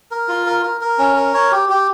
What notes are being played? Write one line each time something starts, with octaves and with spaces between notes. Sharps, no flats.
A#4
F4
A#4
A#4
A#4
C#4
A#4
C#5
G4
G4